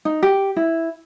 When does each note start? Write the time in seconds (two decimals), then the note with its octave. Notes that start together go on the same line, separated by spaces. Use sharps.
0.05 D#4
0.23 G4
0.56 E4